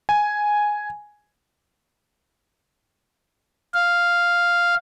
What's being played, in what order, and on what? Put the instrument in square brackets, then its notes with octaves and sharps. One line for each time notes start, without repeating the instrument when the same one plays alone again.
[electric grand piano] G#5
[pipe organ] F5